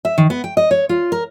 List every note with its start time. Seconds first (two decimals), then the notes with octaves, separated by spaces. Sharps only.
0.05 E5
0.18 D#3
0.30 B3
0.44 G5
0.57 D#5
0.71 C#5
0.89 F4
1.12 A#4